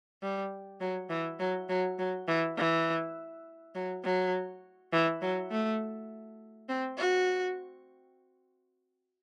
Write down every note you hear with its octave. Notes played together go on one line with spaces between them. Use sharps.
G3
F#3
E3
F#3
F#3
F#3
E3
E3
F#3
F#3
E3
F#3
A3
C4
F#4